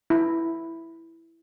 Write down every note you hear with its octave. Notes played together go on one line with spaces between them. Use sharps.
E4